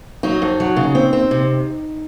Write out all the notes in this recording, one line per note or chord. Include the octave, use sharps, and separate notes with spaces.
F#3 D#4
F2
F#3
C#3
C4
C4
C3